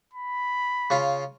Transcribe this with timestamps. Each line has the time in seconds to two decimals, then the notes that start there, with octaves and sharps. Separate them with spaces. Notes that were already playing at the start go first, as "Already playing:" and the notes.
0.13 B5
0.90 C#3 F4